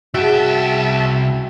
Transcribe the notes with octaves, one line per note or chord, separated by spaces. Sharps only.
C2 F#2 C#3 G#3 F#4 E5 G5 A5